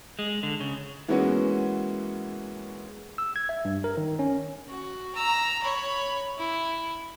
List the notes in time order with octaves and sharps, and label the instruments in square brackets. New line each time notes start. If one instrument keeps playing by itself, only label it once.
[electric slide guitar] G#3
D3
C#3
[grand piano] E3 G#3 A#3 B3 C#4 F#4
[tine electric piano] E6
G#6
E5
G2
A#4
D#3
C#4
[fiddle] F#4
A#5 E6
C#5 B5
E4